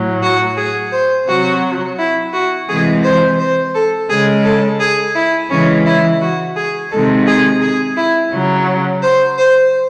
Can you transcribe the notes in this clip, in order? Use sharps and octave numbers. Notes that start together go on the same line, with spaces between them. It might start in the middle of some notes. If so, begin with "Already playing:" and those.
Already playing: A2 F#3
F#4
G#4
C5
C3 F#3 F#4
E4
F#4
C3 E3 G#3 G#4
C5
C5
A4
C#3 G#3 G#4
A4
G#4
E4
C#3 E3 G#3 C#4
E4
F#4
G#4
C3 D#3 G#3 A4
G#4
G#4
E4
C#3 F#3
C5
C5